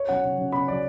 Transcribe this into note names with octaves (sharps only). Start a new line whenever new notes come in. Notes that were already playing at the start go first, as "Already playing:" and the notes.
Already playing: C#5
F#3 C#4 F#5
C#3
F#3 C#4
C#3 B5
F#3 C#4 D5